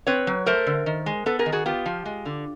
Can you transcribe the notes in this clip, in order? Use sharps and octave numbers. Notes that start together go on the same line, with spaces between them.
C4 B4 C#5
F#3
A3 A#4 C5
D3
D#3
G#3
B3 A4 B4
G#4 A#4
D#3
F#4 G#4
B3 F4 G4
F3
G#3
D3